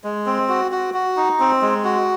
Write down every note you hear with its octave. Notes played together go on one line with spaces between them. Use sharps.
G#3
C4
F#4
F#4
F#4
D#4
C4
G#3
F#4